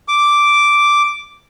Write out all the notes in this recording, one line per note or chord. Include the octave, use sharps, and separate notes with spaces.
D6